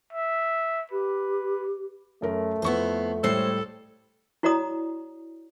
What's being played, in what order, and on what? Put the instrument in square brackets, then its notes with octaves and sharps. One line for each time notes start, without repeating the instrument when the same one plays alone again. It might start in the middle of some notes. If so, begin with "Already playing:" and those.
[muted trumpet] E5
[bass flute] G4 [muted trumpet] B4
[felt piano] F#2 A#4 [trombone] A3
[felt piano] F2 C#6 [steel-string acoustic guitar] B3 E4 C5
[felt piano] A2 G3 C7 [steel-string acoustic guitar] G#3 C5 C#5 [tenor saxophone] A4
[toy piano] E4 F#4 C#5 D5 A#5 D#6